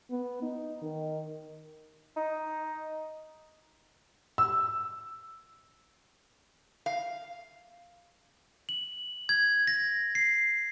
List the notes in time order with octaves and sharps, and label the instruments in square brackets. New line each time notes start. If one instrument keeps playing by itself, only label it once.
[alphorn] B3
D#4
D#3
[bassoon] D#4
[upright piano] E6
[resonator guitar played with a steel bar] F5
[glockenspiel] F#7
G#6
A#6
C7